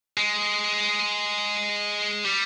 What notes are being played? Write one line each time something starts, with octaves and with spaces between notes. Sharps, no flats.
G#3
G3